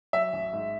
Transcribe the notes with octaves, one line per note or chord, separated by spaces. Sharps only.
F#3 E5
A1
G#2